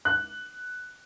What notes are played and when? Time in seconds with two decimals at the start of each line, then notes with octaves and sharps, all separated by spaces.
0.05 F#6